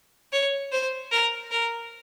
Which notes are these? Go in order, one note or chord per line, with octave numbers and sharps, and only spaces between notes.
C#5
C5
A#4
A#4